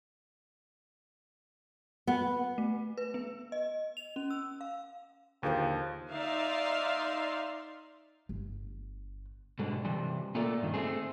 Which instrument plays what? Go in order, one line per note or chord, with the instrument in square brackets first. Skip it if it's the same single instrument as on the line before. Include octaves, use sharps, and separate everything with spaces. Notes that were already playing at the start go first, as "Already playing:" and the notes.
[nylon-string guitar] B3
[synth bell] A3
B4
B3
D#5
F7
C#4
E6
F5
[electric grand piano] D#2 [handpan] D3 G#4 C5 [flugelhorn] F3
[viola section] D#4 D5 E5 F5 C6
[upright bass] G1
[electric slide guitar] G#2 B2 D3 G3 G#3
C3 E3 G3
A#2 A3 A#3 A#4 D5
G2 D#3
A3 C4 G#4